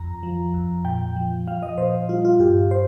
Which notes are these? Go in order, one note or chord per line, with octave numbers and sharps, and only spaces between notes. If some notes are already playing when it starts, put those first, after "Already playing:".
Already playing: F2 A#5
F3
F2
A#2 G5
F3
F3 F5
D#5
A#2 C5
G3 F4
F4
G2 G4
C5